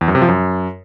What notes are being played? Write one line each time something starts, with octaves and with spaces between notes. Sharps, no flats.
E2
F#2
C3
F3
F#2